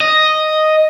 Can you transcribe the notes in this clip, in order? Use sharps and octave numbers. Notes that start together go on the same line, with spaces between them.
D#5